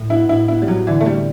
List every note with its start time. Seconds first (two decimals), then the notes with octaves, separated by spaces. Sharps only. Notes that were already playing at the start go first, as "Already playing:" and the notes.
Already playing: A2
0.10 B3 E4
0.29 A2 E4
0.48 B3 E4
0.62 G3
0.68 A2 F#3
0.87 D3 E3
1.01 A3
1.06 G3 C4